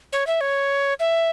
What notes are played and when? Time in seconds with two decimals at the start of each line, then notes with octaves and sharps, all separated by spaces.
0.13 C#5
0.27 E5
0.41 C#5
1.00 E5